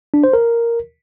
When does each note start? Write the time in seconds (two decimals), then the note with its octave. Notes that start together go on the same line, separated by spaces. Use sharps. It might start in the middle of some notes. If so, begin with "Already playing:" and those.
0.14 D4
0.24 C5
0.33 A#4